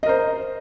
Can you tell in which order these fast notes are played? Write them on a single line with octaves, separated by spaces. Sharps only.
D#5 A#4 C5